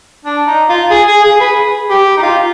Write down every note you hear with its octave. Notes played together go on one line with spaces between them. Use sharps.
D4
D#4
F4
G#4
G#4
G#4
B4
G4
D#4
F4